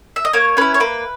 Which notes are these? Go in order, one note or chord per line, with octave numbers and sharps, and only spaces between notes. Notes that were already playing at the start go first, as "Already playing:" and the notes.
E5
D#5
A#3 C#5
C#4 E4 B4
C#5
A#3 B4